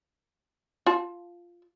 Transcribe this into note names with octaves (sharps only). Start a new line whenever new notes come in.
F4 A5